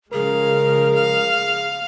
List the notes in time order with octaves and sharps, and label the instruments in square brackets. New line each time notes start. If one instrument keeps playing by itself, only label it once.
[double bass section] C#3 F3 G#3 [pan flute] G#4 [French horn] A#4 [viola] F5
[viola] F5